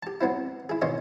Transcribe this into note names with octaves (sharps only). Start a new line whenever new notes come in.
G4 A5
F#3 B3 C4 E4
E4 G#4
B2 D#3 C#4 D#5 G#5 C6